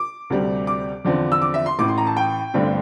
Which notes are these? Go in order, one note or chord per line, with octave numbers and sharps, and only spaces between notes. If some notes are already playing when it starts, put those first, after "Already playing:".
Already playing: D6
D2 C3 G3
D6
E2 D3 F3 C4
E6
D6
E5
C6
A1 A2 E3 D6
C6
A#5
A5
G5
G1 G2 D3 A3 C4